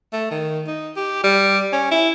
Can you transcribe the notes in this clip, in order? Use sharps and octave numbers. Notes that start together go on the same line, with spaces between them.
A3
D#3
D#4
G4
G3
C#4
E4